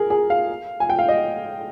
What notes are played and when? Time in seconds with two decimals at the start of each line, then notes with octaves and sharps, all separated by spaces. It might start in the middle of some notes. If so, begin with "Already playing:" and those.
Already playing: G#4 A#4
0.10 G#4
0.30 F5
0.80 G#5
0.90 G5
0.99 F5
1.09 D#5